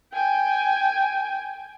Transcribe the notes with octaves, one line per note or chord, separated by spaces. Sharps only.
G5 G#5